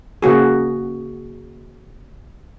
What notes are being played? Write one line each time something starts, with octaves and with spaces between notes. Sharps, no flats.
C#3 A#3 F#4 G#4